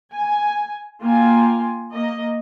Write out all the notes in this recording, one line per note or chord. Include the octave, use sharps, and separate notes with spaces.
G#5
A#3 F4 G5 G#5
A#3 D#5